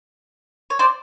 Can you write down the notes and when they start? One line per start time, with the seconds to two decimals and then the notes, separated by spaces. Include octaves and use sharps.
0.70 C#5
0.79 C5 D5